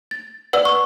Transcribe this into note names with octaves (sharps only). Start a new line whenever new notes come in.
A6
B4 D5 F#5 E6
C#6